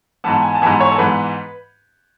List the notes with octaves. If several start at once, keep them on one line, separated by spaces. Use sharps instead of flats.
G#2 E3 B3 A5
G#5
A5
G#2 E3 B3 G#5
C#5
A4
G#2 E3 B3 B4